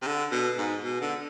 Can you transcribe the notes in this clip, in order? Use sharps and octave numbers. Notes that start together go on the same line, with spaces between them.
C3
D3
B2
G#2
B2
D3